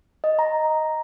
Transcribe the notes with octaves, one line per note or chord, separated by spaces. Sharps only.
D#5
A#5